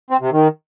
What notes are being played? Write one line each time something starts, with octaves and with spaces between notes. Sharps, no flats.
C4
C3
D#3